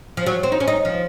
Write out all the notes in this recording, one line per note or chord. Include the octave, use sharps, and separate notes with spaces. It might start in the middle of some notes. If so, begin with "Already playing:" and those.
F3
F#3
C4
D#4
C#4
D#4
F3